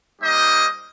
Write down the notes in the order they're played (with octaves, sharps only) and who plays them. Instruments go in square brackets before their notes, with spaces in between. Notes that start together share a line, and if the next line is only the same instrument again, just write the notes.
[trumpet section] G3 A#3 D#4 G4 C5 D#5